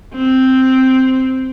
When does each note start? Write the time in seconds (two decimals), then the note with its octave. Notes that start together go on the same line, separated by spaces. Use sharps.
0.15 C4